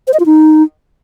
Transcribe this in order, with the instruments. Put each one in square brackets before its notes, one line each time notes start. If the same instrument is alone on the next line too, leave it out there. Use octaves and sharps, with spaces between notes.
[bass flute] C5
D#5
F4
D#4